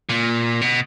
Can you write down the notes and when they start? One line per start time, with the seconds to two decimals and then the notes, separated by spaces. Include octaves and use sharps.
0.09 A#2
0.61 B2